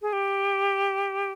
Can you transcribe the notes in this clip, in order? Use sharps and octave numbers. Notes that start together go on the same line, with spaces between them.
G#4
G4